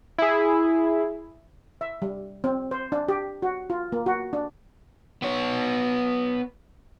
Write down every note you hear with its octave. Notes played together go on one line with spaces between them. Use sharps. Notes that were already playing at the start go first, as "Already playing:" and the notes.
E4 G#4
E5
G3
C4
C5
D4
G4
F#4
F4
A#3
F#4
D4
B3 C#5